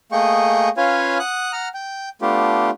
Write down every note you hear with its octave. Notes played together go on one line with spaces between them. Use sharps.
A3 A#3 G#4 D#5 G5 C#6
C#4 F4 B4 C#5 F5 G#5
F#5 D#6 F#6
F#5 A#5 F6
G5
A3 B3 D4 F4 G4